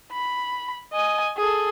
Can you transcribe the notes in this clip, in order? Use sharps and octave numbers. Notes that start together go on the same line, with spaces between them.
B5
D#5 G#5
G#4 A4